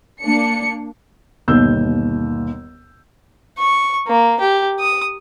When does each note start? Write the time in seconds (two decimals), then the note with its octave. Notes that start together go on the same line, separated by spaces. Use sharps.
0.23 A#3 D4 C#7
1.48 G1 D#2 B2 E6 G6
3.59 C#6
4.07 A#3
4.41 G4
4.80 D#6